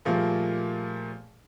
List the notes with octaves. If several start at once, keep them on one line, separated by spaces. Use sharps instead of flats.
A#2 F3 G3 A3 A#3 G#4